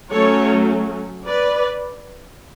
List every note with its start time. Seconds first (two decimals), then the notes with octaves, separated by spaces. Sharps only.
0.12 F#3 A3 C#4 A4 C#5
1.26 B4 D5